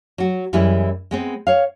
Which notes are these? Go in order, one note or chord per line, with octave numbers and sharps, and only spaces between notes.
F#3 F#4
F#2 E3 G3 G#3 E4
G#3 B3 C4
C#5 F5